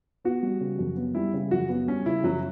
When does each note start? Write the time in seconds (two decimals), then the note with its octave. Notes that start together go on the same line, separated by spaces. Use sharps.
0.24 B3 F#4
0.43 G3
0.61 C#3
0.79 F#2
0.97 B3
1.15 G3 E4
1.34 C#3
1.51 F#2 F#4
1.69 B3
1.87 G3 C#4
2.06 C#3 E4
2.24 F#2 F#3